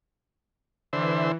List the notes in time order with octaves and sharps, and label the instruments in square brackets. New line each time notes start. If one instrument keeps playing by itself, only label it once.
[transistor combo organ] D3 C5 E5 [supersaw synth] E3